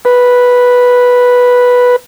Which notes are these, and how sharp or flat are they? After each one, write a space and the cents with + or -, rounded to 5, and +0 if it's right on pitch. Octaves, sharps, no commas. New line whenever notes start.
B4 -5